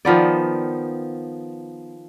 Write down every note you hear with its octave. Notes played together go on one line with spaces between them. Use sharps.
D#3 F3 B3 D5